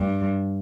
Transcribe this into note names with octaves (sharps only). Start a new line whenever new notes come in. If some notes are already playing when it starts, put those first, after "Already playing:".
Already playing: G2